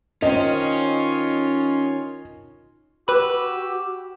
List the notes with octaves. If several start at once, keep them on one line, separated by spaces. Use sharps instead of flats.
D#3 C4 C#4 F4 C#5 D#5
F#4 G4 B4 B5 E6